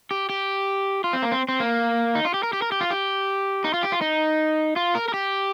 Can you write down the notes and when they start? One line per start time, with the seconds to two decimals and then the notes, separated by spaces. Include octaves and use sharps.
0.11 G4
0.29 G4
1.04 F4
1.13 C4
1.22 A#3
1.32 C4
1.49 C4
1.60 A#3
2.15 D#4
2.25 F4
2.34 G4
2.43 A#4
2.53 G4
2.62 A#4
2.72 G4
2.81 F4
2.91 G4
3.64 D#4
3.74 F4
3.83 G4
3.92 F4
4.01 D#4
4.76 F4
4.95 A#4
5.08 A#4
5.14 G4